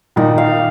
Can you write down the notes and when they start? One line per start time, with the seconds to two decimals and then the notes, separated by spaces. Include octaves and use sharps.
0.16 A#2 D#3 D#4
0.38 F5